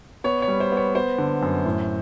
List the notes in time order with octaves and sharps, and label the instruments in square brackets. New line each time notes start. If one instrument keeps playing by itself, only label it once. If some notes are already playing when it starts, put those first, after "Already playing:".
[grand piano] B3 C#5
C#5
G3
C5
B3 C#5
B3 C5
D3
F#2
A2